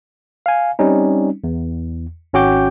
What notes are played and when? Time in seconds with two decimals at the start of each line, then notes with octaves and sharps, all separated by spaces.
0.46 F5 G#5
0.79 G3 C4 C#4 D#4
1.44 E2
2.33 G#1 C#4 F#4 G5 D6 G6